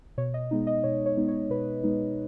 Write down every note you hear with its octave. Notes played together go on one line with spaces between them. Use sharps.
B2 C#5
D#5
G#3 B3 D#4
D#5
B2 C#5
C#5
G#3 B3 D#4
C#5
B2 B4
G#3 B3 D#4